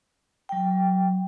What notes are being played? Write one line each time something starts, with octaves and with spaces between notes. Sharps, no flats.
F#3 G5